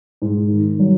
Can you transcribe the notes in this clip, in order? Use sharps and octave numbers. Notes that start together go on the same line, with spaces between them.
G#2
D#3
F#3